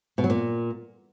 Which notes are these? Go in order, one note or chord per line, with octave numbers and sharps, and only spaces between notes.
B2
F#3
A#2